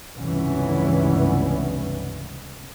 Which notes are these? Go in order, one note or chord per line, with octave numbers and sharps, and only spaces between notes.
F1 C#2 G2 E3 B3 C#4